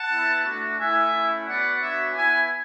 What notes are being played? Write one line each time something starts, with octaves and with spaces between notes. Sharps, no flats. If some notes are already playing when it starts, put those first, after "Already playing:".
Already playing: F#5 A5
B3 E4
A3 D4 F#4
A3 E4 E5 G#5
A3 C#4 E4
B3 F#4 D5 F#5
B3 D4 F#4 C#5 E5
B3 E4 E5 G#5